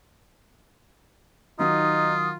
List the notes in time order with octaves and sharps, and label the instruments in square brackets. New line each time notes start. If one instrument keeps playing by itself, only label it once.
[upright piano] D#3 F#3 [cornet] D#4 [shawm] F4 [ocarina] D#6